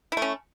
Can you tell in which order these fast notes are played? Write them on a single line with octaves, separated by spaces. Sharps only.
E4 A3 C#4